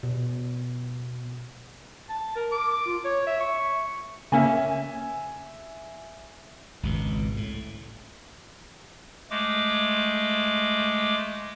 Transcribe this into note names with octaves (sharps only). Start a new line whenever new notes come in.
B2
A5
A#4
D6
F4
C#5
E5
C#6
C#3 A#3 C#4 E5 G#5
G#1 C#2 B2
A2
G#3 A3 D6